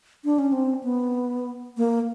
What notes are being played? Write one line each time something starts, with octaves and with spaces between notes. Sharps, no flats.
D4
C#4
C4
B3
A#3